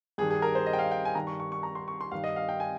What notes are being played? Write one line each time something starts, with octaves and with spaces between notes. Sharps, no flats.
G2 D#3 G#4
G#4
A#4
C5
D#5
G5
F5
G5
G#5
G2 D#3 A#5
C#6
C#6
C#6
A#5
C6
C#6
C6
G2 D#3 F5
D#5
F5
G5
G#5